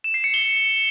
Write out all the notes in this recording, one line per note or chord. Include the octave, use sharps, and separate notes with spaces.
E7
C7
C#7
G7